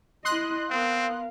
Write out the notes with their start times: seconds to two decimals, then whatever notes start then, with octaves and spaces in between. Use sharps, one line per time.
0.25 E4 D#5 C6 D#6 F#6
0.70 B3 C4 A#4 F5